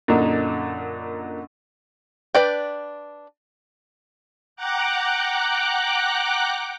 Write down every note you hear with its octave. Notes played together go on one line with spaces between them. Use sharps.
F#2 A#2 D3 D4 D#4
D4 B4 D5 G5
F#5 G5 A#5 D6 F#6